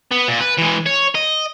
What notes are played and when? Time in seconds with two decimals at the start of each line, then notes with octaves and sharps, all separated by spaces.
0.11 B3
0.28 A#2
0.41 B4
0.58 E3 G#3
0.86 C#5
1.15 D#5